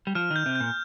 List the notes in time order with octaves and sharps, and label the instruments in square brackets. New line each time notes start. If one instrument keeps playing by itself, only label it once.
[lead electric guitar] G3
[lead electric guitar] F3 [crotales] F6
[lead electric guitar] D#3
[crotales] G6
[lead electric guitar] C3
[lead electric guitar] A#2 [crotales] G6